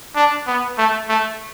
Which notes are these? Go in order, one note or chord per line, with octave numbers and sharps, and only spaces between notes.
D4
B3
A3
A3